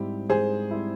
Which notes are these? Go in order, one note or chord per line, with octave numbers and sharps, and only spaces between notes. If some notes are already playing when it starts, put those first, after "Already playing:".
Already playing: G#2 G3 C4 E4 G4
G#2 G#4 C5
G3 C4 E4